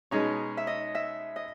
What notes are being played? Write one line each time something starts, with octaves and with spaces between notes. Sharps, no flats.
B2 G#3 C#4 D#4 G#4 C#5
E5
D#5
E5
D#5